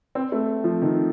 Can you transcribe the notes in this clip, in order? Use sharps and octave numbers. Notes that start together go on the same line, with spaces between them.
C4
A3
F3
D#3